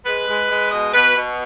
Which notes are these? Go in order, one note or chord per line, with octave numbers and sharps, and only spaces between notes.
G#3 B4
G#3
G#3
B2 D#5
B2 B4
B2